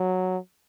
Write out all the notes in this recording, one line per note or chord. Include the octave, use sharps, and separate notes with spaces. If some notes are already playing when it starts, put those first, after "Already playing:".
Already playing: F#3